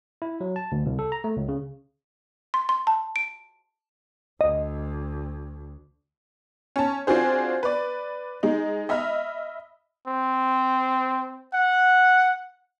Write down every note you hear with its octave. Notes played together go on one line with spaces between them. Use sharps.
E4
F#3
A5
D2
C2
A4
A#5
A3
C#2
C#3
C6
C6
A5
D7
D2 D#5
C#4 A5
C4 D4 F4 F#4 G#4 C5
B4 D5
G#3 D#4
D#5 E5 B5 F6
C4
F#5